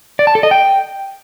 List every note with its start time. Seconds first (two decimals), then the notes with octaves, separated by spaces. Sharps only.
0.19 D5
0.27 A5
0.35 A4
0.43 D#5
0.51 G5